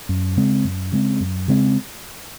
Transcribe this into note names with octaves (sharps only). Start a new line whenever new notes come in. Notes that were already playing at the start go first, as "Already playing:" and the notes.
F#2
C#3 G#3 C4
F#2
C#3 G#3 C4
F#2
C#3 G#3 C4